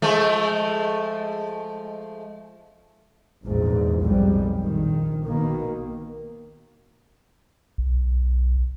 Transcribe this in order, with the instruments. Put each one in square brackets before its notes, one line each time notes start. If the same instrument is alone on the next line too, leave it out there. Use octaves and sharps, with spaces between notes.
[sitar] F3 G#3 A3
[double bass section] A#1 E2 G#2
B1 F2 G#2 G3
A#1 D#3
B2 D#3 A#3
[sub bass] B1